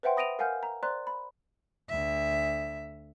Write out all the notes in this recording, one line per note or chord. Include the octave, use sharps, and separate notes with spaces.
B4 C5 E5 F#5 G5 C6
B5 D#6 A#6 D7 D#7 F7
A#4 F5 F#5 G#5 F6 G6
A#5
C5 D5 A#5 C6 F#6
B5
D2 E5